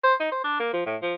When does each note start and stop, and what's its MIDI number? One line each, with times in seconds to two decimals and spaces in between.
0.04 0.14 72
0.20 0.31 63
0.32 0.42 72
0.44 0.56 62
0.60 0.70 58
0.73 0.85 53
0.86 0.96 45
1.02 1.15 53